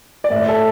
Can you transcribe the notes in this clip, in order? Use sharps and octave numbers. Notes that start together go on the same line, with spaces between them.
D5
A2 E5
A4